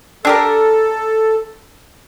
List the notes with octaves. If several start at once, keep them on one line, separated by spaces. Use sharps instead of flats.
D4 G4 A4 A#4